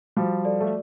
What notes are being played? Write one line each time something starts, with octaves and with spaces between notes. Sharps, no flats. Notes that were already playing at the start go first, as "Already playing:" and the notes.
F3 G3 F#4
A4 D5
A3